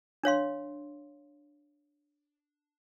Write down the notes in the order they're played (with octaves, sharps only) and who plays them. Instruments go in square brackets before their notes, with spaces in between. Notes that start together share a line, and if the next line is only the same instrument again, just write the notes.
[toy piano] D4 C#5 F5 C6